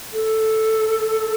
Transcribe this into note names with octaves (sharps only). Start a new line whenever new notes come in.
A4